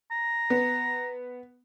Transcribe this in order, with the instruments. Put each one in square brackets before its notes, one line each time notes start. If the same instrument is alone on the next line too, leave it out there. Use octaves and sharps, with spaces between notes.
[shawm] A#5
[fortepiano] B3